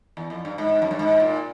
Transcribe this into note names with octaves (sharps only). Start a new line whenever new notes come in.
E2
F2
G2
G#2
F#2
G2
G#2
A#2